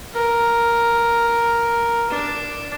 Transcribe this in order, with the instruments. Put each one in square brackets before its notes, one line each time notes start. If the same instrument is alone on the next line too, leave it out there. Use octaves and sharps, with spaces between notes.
[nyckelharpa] A#4
D4